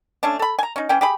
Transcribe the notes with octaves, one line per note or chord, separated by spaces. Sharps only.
A3 C#4 D4
A4 B5
G#5 A#5
C#4 D#4
E3 C#4 G5
G4 G#4 B5